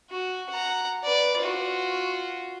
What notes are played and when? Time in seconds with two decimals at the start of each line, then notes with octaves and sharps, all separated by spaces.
0.11 F#4
0.50 F#5 A#5
1.04 B4 D5
1.39 F4 F#4